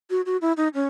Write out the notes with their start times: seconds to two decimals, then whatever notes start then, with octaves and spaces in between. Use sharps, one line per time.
0.10 F#4
0.26 F#4
0.41 E4
0.57 D#4
0.74 C#4